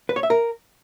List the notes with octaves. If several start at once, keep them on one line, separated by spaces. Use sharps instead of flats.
B4
C#5
E5
A#4